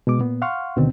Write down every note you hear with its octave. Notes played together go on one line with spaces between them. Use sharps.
B2 G#3 D6
A#2 B3
F5 F#5 C6 C#6 F6
D2 B2 D3 D#3 C4